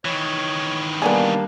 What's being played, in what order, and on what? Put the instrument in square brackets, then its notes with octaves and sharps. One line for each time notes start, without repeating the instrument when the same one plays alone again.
[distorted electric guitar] D#3 E3 [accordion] C#5
[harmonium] G3 A#3 [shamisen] B3 D#4 G#4 [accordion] D4